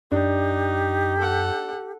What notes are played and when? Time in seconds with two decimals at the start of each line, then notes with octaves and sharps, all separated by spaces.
0.12 F#2 D4 D#4 G4
1.18 A4 F#5